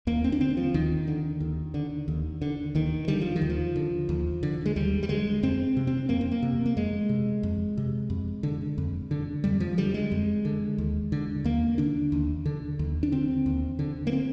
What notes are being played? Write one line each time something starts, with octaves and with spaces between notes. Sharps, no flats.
D#2 A#3
C4
D4
D3 C4
F3
D#2 D#3
D3
D#2
D3
D#2
D3
D#2 D#3
D3 G3
F3
D#3
D#2
F3
D3
D#2
D3
G#3
D#2 G3
G3
D3 G#3
F2 C4
C3
C4
F2 A#3
C4
A#3
C3
A#3
F2 G#3
C3
F2
C3
F2
D3
F2
D3
F2 G3
F3
D3 G3
G#3
F2
D3
D#2
D3
D#2 A#3
D3 D4
D#2
D3
D#2
D4
D3 C4
D#2
D3
A#3
C4